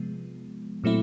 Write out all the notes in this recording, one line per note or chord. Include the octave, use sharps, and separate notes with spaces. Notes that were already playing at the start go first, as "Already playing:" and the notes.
Already playing: C3 F3 G#3 B3
A#2 F#3 A3 C4 E4